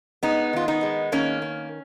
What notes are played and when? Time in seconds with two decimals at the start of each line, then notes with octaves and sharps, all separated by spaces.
0.23 G#3 B3 D#4
0.53 D#3 F4
0.68 B3 D#4
0.83 G#3
1.12 D#3 A#3 C#4
1.42 A#3